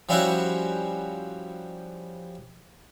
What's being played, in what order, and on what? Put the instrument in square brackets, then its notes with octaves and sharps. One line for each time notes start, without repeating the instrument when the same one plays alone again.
[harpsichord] F3 G3 C#4 E4 F#4 C#5